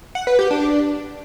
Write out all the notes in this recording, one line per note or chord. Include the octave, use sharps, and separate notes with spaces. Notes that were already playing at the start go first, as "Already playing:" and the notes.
F#5
B4
G4
D4